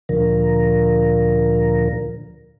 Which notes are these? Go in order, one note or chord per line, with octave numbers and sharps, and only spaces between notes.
D2 A#2 D3 F3 A#4